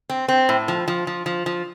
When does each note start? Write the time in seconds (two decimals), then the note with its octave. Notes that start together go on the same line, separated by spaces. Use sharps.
0.09 C4
0.28 C4
0.49 A2
0.68 F3
0.88 F3
1.07 F3
1.26 F3
1.46 F3